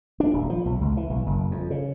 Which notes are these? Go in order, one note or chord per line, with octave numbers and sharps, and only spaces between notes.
D4
D#1
F3
B1
C#2
E3
B1
F#1
F2
C#3